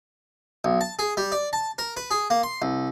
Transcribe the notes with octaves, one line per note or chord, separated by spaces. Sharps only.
B1
A5
G#4
G3
D5
A5
A#4
B4
G#4
A#3
C6
C2